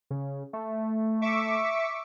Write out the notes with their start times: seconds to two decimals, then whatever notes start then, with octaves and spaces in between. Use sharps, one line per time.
0.10 C#3
0.53 A3
1.22 E5 C#6 D6